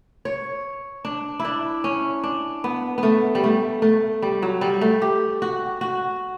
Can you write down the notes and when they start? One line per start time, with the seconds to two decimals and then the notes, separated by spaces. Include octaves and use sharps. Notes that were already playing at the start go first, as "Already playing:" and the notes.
0.25 C#5
1.05 D4
1.39 E4
1.45 D4
1.84 C#4
2.23 D4
2.64 B3
2.98 B3
3.03 A3
3.35 G3
3.44 A3
3.82 A3
4.22 G3
4.42 F#3
4.61 G3
4.81 A3
5.02 G4
5.42 F#4
5.81 F#4